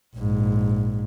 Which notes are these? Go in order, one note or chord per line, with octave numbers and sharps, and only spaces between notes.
A#1 G#2